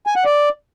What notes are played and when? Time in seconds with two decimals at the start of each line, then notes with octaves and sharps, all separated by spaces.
0.07 G#5
0.16 F#5
0.25 D5